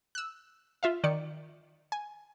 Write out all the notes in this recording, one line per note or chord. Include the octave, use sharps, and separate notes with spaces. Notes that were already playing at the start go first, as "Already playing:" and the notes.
E6 F#6
F4 E5 F5
D#3 D5 C#7
G#5